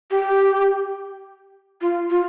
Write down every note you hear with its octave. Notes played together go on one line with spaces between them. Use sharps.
G4
F4
F4